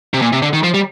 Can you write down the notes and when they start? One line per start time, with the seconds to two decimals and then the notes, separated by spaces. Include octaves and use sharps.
0.14 C3
0.22 A#2
0.33 C3
0.42 D3
0.53 D#3
0.63 F3
0.74 G3